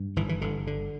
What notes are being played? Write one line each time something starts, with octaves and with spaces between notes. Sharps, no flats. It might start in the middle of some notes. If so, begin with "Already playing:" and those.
Already playing: G2
G1 E3
E3
G1 D3
D3